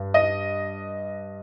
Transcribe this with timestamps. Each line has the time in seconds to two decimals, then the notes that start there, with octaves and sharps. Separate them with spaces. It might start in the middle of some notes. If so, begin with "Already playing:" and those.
Already playing: G2
0.14 D#5